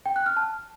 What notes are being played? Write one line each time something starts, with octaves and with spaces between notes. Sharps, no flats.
G5
F#6
F6
A5